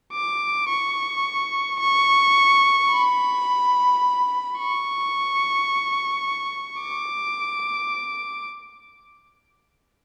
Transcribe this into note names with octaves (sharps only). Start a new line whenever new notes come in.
D6
C#6
C#6
B5
C#6
D6